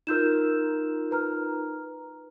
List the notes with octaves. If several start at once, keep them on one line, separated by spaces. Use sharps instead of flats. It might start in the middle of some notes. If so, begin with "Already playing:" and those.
D#4 F4 A#4 E6 G6 E7
B4 A#5 F6